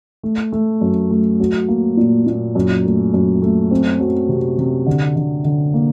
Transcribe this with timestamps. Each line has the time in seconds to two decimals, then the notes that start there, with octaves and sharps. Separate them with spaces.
0.23 A3
0.52 A3
0.81 F#2
1.11 A3
1.40 F#3
1.68 A#3
1.97 A#2
2.27 A#2
2.55 F#2
2.85 A3
3.14 F#2
3.42 A3
3.71 C4
4.00 F#3
4.29 C3
4.58 C3
4.86 D3
5.16 D3
5.45 D3
5.74 A#3